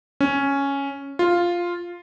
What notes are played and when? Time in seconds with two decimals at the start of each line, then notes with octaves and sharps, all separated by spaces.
0.21 C#4
1.19 F4